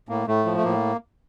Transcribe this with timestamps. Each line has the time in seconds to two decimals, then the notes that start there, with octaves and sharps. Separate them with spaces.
0.09 A2 A#3
0.27 A2 A3
0.45 F3
0.57 A3
0.64 A2 A#3